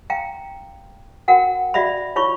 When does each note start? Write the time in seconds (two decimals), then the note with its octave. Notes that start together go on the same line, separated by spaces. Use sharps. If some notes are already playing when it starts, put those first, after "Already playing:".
0.10 F5 G5 A#5
1.28 F#4 A#4 F#5 G5
1.74 F#4 D5 E5 F5 B5
2.16 E4 F4 C#5 B5 C#6